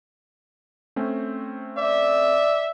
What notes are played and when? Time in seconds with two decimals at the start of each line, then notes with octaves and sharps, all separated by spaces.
0.96 A3 C4 C#4
1.77 D5 E5